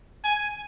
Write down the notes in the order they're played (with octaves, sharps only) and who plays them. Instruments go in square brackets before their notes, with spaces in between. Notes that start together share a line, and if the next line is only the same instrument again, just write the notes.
[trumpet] G#5